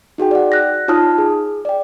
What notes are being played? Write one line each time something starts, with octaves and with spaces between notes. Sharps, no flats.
D#4 F#4 G#4 G5
D5 F#5
F#6 A#6
D#4 F4 C#5 A5 D#6 F6
G#4
D5 G5